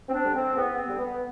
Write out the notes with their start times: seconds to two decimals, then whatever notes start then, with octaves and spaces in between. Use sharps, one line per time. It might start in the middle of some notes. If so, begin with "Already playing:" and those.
0.09 C4
0.13 D4
0.23 D3 G3
0.35 C4
0.55 E2 B3
0.77 C4
0.87 D3 G3
0.98 B3